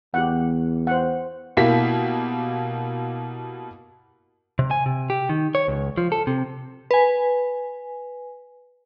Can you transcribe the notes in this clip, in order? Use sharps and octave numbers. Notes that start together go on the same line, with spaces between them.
E2 G4 F#5
C5 F#5
B2 A#3 E4 G4 B6
C3
G#5
C3
G4
D#3
C#5
C#2
F3
A4
C3
B4 G#5